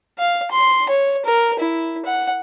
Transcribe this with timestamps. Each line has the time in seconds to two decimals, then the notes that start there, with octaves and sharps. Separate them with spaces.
0.18 F5
0.51 C6
0.89 C#5
1.25 A#4
1.59 E4
2.05 F#5